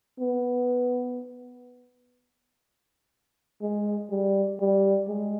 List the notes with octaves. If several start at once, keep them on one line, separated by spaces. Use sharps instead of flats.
B3
G#3
G3
G3
G#3